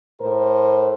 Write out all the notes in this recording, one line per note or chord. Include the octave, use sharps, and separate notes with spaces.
A2 A#4 C5